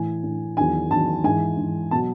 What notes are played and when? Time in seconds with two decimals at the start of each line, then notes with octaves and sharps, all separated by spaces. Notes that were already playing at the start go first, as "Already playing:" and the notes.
Already playing: A2 E3 G#5
0.23 A2 E3
0.57 E2 D#3 F#3 G#5
0.90 E2 D#3 F#3 A5
1.24 G#2 E3 G#5
1.57 G#2 E3
1.91 B2 F#3 A5